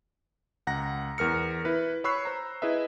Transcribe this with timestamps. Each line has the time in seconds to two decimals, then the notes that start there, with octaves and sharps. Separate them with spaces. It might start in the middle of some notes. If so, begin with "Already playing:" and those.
0.67 C#2 F#5 A#5 A#6
1.18 E2 A#4 F6 C#7
1.65 E4 B4
2.04 C#5 B5 C#6 E6 F#6 C7
2.25 C5 A#5
2.62 E4 G#4 B4 D#5 E5